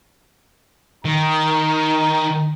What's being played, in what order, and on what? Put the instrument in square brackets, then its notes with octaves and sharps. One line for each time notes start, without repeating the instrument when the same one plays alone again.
[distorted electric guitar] D#3 [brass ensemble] D#4 A#5